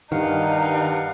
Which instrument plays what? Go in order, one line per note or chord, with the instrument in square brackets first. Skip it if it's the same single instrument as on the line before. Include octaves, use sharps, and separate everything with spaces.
[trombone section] G2 [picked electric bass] D#3 [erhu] D#4 [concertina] F5 F#5